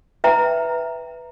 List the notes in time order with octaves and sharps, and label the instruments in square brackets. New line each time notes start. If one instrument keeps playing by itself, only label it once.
[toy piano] B4 E5 G5 A#5